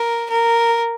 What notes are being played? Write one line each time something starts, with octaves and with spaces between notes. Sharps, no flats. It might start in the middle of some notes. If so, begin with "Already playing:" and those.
Already playing: A#4
A#4